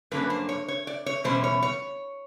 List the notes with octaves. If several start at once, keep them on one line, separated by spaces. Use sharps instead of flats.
G2 D3 F#3 A#3 C#4 B4
C5
C#5
C#5
D5
C#5
E2 B2 G3 C#4 C5
C#5
C#5